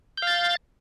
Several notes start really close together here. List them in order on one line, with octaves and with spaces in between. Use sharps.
G6 F5 A6